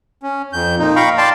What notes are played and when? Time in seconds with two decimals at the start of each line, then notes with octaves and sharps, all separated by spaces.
0.23 C#4
0.53 F2 G6
0.79 A#2 D#4
0.96 F5 G5 A#5 B5 C#6
1.18 D5 F5 G5 A5 C6